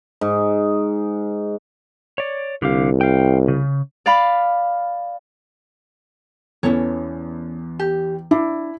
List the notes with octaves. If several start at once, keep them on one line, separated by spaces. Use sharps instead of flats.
G#2
C#5 D5
C2 D3 G4 F5
F5 G5
C#3
D5 F5 B5
E2 E3 C#4 A4 C#5
G4
D4 E4